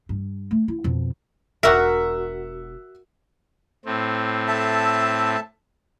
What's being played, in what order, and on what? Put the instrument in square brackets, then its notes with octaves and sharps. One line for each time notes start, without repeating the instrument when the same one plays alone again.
[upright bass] G2
A3
E4
F2 B2
[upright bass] E1 D4 [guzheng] F#4 A#4 [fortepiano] E5 F#5
[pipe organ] A2 C4
[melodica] A4 E5 A5